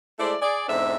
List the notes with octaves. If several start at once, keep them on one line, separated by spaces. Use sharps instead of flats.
G#3 A3 E4 C5 D5
G#4 D5
E2 G#2 C4 D4 A4 E5